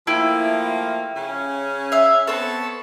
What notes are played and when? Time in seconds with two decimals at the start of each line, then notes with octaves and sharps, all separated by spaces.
0.07 F3 A3 A#3 E4 G4 B5
1.16 C#3 C#4
1.92 E5 F5
2.27 B3 C4 A4 C#5